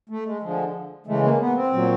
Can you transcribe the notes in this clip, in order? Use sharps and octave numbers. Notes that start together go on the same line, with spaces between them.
A3
G#3
D3 F3 G#3
C#3 E3 G#3 A3
A#3
B3
C4
A#2 F#3